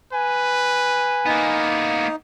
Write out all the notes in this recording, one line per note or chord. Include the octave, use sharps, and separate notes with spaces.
B4 G#5
A#3 B3 D#4